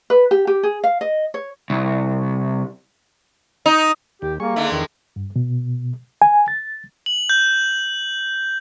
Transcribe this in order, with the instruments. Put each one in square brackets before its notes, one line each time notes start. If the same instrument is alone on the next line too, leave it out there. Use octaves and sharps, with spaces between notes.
[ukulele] B4
G4
G4
G#4
F5
D#5
C#5
[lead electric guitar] C2
[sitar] D#4
[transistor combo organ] D#2 [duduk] G4
[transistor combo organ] G3 G#4 C#6 [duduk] A#3
[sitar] D3 G#3 A3 [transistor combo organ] D#4 E5
[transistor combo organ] E2 [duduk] D#3
[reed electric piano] G2
B2
G#5
A6
[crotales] F#7
G6